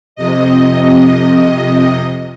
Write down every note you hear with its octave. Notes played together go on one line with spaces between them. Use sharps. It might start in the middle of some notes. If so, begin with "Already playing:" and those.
F2 C3 D#5